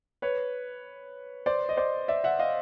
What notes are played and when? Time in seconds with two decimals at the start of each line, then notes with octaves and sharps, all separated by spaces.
0.22 B4 C#5
1.46 C5 D5
1.69 D#5
1.77 C5 D5
2.08 D5 E5
2.24 E5 F#5
2.39 D#5 F5